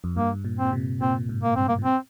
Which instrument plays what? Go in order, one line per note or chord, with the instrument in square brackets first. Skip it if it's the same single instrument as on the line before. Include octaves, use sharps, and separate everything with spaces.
[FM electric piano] F2
[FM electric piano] G2 [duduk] A#3
[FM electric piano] A#2
[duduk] C4
[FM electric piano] A#2
C3
[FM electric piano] A#2 [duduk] C4
[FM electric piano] G#2
[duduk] A#3
[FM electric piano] G2 [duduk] C4
[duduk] A#3
[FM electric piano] A#2
[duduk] C4